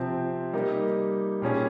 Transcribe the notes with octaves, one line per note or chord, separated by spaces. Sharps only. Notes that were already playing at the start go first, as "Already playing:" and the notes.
Already playing: C3 F3 C4
G3 A#3 D#4 G4
A#2 G3 C#4 G#4